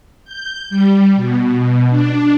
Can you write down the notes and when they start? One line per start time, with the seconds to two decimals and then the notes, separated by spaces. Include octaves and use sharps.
0.25 G6
0.70 G3
1.16 B2
1.90 D4